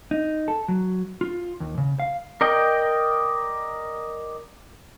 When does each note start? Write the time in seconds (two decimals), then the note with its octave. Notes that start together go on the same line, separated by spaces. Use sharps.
0.11 D#4
0.48 A4
0.68 F#3
1.21 F4
1.60 D#2
1.78 C#3
2.00 F5
2.41 A#4 D5 D#5 G5